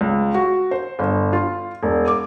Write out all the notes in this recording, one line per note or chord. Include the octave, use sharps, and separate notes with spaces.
C#2
F#4
C5
G1
F4
E1
D6